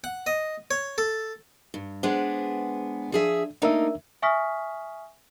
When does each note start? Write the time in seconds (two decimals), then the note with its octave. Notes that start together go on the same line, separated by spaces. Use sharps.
0.04 F#5
0.27 D#5
0.71 C#5
0.98 A4
1.74 G2
2.03 G#3 B3 D4 C5
3.12 F3 D4 G#4 E5
3.62 A3 A#3 D4 D#4 A#4 E5
4.22 E5 G#5 C#6 D#6 F6 B6